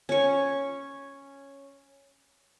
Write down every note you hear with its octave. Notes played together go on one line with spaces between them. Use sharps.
C#4 C#6